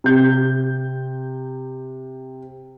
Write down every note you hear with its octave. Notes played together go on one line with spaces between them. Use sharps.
C3 G6